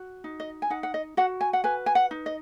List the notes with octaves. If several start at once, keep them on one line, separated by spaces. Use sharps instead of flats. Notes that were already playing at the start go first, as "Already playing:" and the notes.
Already playing: F#4
D#4
D#5
G#5
D#4 F#5
F#5
D#5
F#4 F#5
G#5
F#5
B4 G#5
G#5
F#5
D#4
D#5